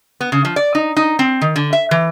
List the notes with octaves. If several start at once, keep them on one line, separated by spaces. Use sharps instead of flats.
B3
C#3
F3
D5
D#4
D#4
C4
D#3
D3
E5
E3